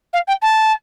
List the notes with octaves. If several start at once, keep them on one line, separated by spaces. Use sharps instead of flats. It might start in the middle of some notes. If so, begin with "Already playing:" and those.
F5
G5
A5